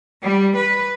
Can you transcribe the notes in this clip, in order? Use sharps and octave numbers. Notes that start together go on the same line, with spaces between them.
G3
B4